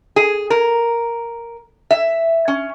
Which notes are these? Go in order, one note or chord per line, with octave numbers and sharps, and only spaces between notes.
G#4
A#4
E5
C#4